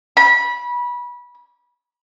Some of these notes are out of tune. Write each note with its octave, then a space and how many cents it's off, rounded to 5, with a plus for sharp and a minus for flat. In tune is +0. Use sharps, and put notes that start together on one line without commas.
B5 -25